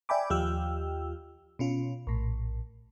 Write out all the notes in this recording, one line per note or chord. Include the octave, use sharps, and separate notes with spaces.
D5 E5 G5 G#5 B5 D6
D#2 F3 F4 G4 G5 E6
B2 C#4 F4
A#1 A2